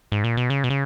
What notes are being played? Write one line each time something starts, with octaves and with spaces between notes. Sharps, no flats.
G#2
A#2
B2
C#3
B2
C#3